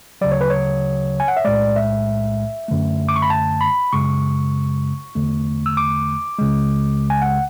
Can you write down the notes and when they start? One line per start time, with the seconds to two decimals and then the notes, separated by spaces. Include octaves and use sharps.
0.21 D2 C#3 F#3 D5
0.32 C#5
0.41 B4
0.50 C#5
1.20 G#5
1.28 F#5
1.37 E5
1.45 B1 A2 G#3 D5
1.76 E5
2.68 F#2 D3 A3
3.09 D6
3.16 C#6
3.22 B5
3.30 A5
3.61 B5
3.93 F#2 C#3 G#3 C#6
5.16 E2 D3 A3
5.66 E6
5.77 D6
6.39 C#2 C#3 G#3
7.10 G#5
7.22 F#5